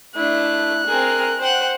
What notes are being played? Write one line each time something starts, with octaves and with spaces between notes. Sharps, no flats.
A3 D4 E4 F#6
C4 G#4 A#4
C5 F#5 G5